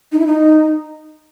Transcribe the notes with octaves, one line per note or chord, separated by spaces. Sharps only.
D#4
E4
D#4